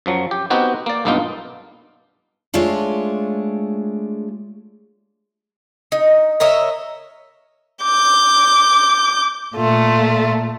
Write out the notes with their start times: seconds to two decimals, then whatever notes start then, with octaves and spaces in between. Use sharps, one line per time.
0.06 F#2 F3 F#3
0.31 G4
0.50 B3 C4 D#4 F#4 G4
0.86 A#3 D5
1.05 B1 G2 A#3 B3 D#4 F4
2.54 G#3 A3 D4 F4 C#5
5.92 D#4
6.40 A#4 C#5 D#5 E5
7.83 D6 G6
9.56 A#2 A3 F4